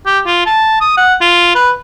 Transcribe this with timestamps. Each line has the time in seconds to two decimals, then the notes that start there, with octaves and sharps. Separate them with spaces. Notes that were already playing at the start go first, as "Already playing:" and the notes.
0.06 G4
0.26 F4
0.46 A5
0.81 D#6
0.97 F#5
1.21 F4
1.55 B4